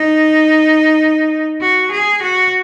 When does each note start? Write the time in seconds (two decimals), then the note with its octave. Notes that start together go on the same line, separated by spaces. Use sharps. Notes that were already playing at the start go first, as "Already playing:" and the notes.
Already playing: D#4
1.61 F#4
1.91 G#4
2.22 F#4